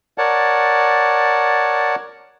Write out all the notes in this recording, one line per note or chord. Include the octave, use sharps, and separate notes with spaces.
A#4 C#5 D5 F#5 A5